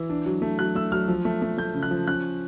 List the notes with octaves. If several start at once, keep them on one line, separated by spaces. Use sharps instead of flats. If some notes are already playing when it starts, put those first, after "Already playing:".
Already playing: E3 E6
D4
F#3
A3
F#3 F#6
A3 E6
F#3 F6
F3
A3
A3
A3 G6
C#3
F#6
F3
C#4 F#6